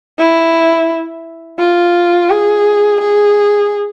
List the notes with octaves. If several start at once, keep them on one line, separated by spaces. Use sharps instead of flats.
E4
F4
G#4
G#4